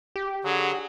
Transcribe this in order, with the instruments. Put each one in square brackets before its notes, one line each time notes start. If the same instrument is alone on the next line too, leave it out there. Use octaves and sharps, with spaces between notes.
[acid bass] G4
[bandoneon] D3 G#4 [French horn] F#3